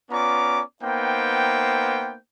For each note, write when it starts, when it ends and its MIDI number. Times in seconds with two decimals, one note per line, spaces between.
0.11 0.61 59
0.11 0.61 61
0.11 0.61 65
0.11 0.61 74
0.11 0.61 82
0.11 0.61 86
0.81 2.17 58
0.81 2.17 59
0.81 2.17 63
0.81 2.17 72
0.81 2.17 79